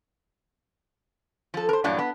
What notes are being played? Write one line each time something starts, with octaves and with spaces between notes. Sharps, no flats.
F3 A4
A#4 C5
G2 A#2 E3 F#3 D4
B3